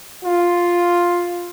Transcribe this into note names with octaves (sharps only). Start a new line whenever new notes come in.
F4